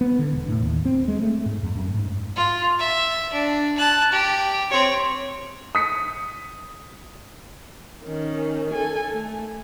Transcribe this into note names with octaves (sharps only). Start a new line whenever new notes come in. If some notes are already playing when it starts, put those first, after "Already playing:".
B3
D3
E1
A2
D#2
C4
G#3
A3
G#2
F2
F#2
G#2
F4
E5
D4
A5 F#6
G4
C4 C#5
D#6 B6 C#7
D#3 C#4
A4 G#5
A3